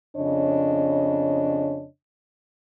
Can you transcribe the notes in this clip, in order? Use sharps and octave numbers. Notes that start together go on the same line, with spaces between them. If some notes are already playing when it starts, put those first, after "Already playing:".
F2 C#3 D4 C#5 D#5